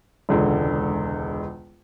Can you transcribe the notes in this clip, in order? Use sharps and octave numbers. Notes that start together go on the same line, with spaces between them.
E1 C#2 D3